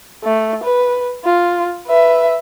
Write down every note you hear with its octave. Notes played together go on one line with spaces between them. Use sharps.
A3
B4
F4
B4 E5